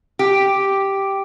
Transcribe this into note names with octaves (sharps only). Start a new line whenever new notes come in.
G4